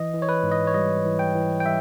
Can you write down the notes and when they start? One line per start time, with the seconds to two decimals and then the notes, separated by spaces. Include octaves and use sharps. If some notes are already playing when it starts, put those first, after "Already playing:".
Already playing: E3 D#5
0.14 E3
0.22 C#5
0.29 B4
0.43 G#2
0.51 D#5
0.67 C#5
0.74 G3 D#5
1.05 E3
1.19 G5
1.35 E3
1.60 G5
1.65 G3 E5